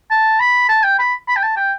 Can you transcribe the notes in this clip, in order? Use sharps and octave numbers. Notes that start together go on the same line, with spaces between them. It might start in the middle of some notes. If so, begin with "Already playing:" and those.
A5
B5
A5
G5
B5
B5
G5
A5
G5